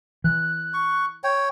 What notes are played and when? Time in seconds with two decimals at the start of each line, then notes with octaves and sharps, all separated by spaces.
0.24 E3 F#6
0.74 C#6
1.24 C#5 G5